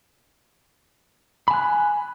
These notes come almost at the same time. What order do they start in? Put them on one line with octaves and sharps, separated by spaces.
B5 G#5 F#6